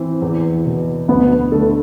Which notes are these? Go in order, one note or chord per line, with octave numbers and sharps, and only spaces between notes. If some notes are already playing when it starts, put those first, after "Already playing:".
Already playing: E3 C4
E2
B2
D2 B3 B4
D3 A3 A4